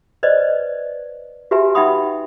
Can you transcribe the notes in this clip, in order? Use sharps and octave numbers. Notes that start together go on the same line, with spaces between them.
B4 C5 D5 D#5
F#4 G4 B4 E5 G#5 A#5
D#4 E5 F#5 G5 B5 D#6